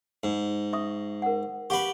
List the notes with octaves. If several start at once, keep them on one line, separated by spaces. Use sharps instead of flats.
G#2
E5 C#6 D#6
A#4 F#5
G4 B4 F5 F#5 C#6